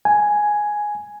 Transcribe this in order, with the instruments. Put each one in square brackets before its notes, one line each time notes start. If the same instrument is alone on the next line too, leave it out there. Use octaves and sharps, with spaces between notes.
[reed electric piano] G#5